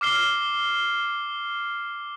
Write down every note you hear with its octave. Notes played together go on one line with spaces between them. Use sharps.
D6 F6 C7 G7